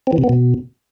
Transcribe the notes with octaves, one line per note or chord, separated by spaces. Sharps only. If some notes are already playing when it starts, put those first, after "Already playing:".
C4
E3
C3
B3
B2